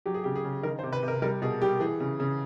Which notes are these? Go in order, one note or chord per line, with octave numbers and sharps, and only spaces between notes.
F#3 G4
G#4
C#3 G4
G#4
C#3
D#3 A#4
C5
C3
B4
C3
A#4
G3 A#4
B2 G#4
G3 G4
E3 G#4
C#3
C#3